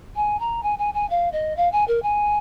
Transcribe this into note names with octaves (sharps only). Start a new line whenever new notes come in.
G#5
A#5
G#5
G#5
G#5
F5
D#5
F5
G#5
A#4
G#5